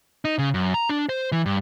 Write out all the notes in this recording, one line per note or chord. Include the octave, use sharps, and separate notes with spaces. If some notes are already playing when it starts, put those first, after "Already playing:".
D#4
C#3
F#2
A#5
D4
C5
E3
G2